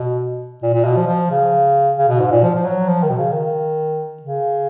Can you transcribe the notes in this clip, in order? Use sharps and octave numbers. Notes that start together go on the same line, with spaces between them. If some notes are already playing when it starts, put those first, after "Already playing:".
Already playing: B2
A#2
A#2
B2
F3
F3
C#3
C#3
B2
G#2
A#2
F3
F3
F#3
F3
D#3
B2
C#3
D#3
C#3